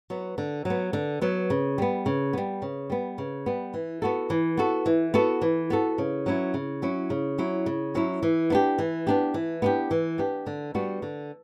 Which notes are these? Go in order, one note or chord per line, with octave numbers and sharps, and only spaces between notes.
F#3 B3
D3
F#3 B3
D3
F#3 B3
C#3
G3 B3
C#3
G3 B3
C#3
G3 B3
C#3
G3 B3
E3
B3 F#4 A4
E3
B3 F#4 A4
E3
B3 F#4 A4
E3
B3 F#4 A4
C#3
F#3 C#4 E4
C#3
F#3 C#4 E4
C#3
F#3 C#4 E4
C#3
F#3 C#4 E4
E3
B3 D4 G4
E3
B3 D4 G4
E3
B3 D4 G4
E3
B3 D4 G4
D3
G3 B3 D4 F#4
D3